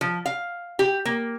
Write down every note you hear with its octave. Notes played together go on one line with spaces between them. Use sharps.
F3
F5
G4
A#3